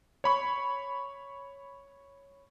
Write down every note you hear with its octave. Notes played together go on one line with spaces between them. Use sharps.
C#5 B5 C#6